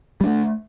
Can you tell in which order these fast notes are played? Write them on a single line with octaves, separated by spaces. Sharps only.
G3 D4 A3